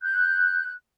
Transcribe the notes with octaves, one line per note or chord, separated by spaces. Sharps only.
F#6 G6